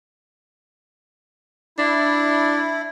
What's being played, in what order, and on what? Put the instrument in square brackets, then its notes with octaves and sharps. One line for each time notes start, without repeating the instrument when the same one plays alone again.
[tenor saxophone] D4 [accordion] E4